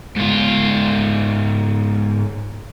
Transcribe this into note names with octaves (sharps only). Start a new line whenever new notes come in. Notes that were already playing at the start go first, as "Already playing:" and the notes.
G#2 F4